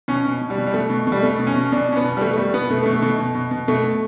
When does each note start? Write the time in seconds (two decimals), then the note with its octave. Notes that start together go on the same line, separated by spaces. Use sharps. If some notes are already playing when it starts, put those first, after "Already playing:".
0.08 B2 C#4
0.25 B2
0.42 B2
0.50 G3
0.58 B2
0.66 G3
0.74 B2 A3
0.90 B2
1.07 B2 G3
1.22 B2 A3
1.39 B2
1.47 C#4
1.56 B2
1.72 B2 D4
1.89 B2 C#4
1.96 B3
2.05 B2
2.17 G3
2.21 B2 A3
2.33 A3
2.37 B2 G3
2.54 B2 B3
2.70 B2 A3
2.83 B2 A3
2.95 A3
3.02 B2
3.19 B2
3.35 B2
3.51 B2
3.68 B2 A3
3.84 B2